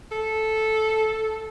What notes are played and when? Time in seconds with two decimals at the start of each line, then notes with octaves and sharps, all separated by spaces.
0.12 A4